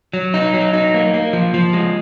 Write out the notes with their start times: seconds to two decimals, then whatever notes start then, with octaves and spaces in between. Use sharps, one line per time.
0.13 F#3
0.34 D#4
0.54 F#3
0.73 D#4
0.94 A#3
1.14 A#3
1.33 F3
1.54 F3
1.73 G#3